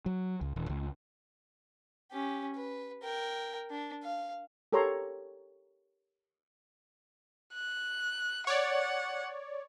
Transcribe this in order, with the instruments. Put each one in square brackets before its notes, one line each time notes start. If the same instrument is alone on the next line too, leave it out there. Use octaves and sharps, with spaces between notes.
[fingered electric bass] F#3
C#2
D#1
C#2
[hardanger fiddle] C#4 G4
B4
A#4 G5
D4
F5
[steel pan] G4 A4 A#4 C#5 A#5 C6
[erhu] F#6
[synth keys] C#5 D5 [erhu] F#5